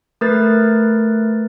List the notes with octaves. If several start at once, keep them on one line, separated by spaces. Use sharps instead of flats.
A3 A#4 B4 A6